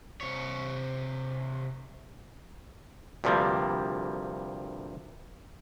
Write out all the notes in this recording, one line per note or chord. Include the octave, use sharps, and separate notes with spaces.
C3 C#5
D2 G2 C3 F3 G3 A#3